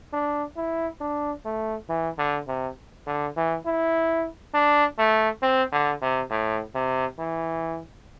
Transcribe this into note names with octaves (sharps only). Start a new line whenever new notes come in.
D4
E4
D4
A3
E3
D3
C3
D3
E3
E4
D4
A3
C4
D3
C3
A2
C3
E3